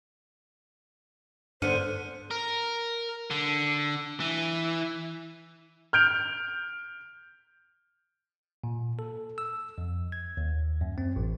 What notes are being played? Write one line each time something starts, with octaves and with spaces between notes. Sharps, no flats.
G2 D3 B3 C5 F6 C#7 D#7
A#4
D3
E3
F6 G6 D7 F7
A#2
A4
E6
F2
G#6
D#2
F#2
C4
A1